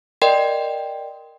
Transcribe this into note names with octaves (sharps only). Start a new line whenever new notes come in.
A#4 D5 D#5 G5 C6